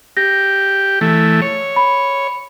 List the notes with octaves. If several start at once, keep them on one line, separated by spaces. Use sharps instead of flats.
G4 A#6
E3 A3
C#5
B5